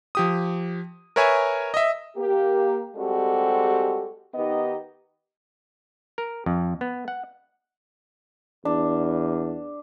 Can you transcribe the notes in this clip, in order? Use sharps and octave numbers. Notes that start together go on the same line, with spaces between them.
F3 G4 D#6
A#4 B4 C#5 E5 G#5
D#5 E5
A#3 G4
G3 G#3 C4 F#4 G4 A4
D#3 B3 D#4 G4 D#5
A#4
F2
B3
F#5
E2 D4